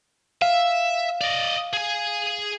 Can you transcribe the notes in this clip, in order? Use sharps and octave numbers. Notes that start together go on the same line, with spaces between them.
E5 F5
D5 D#5
G#4 G#5